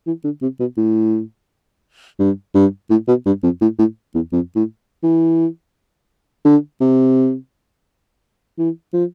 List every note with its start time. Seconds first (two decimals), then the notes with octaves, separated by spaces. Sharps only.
0.07 E3
0.24 D3
0.42 C3
0.60 B2
0.77 A2
2.19 G2
2.55 G2
2.90 A2
3.08 B2
3.26 G2
3.43 F2
3.61 A2
3.79 A2
4.14 E2
4.32 F2
4.56 A2
5.03 E3
6.45 D3
6.81 C3
8.58 E3
8.93 F3